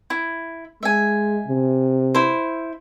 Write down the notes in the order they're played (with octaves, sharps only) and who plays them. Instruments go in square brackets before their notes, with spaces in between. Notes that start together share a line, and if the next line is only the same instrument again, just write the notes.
[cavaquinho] E4
[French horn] G#3 [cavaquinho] E5 G#5
[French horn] C3
[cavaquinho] E4 C5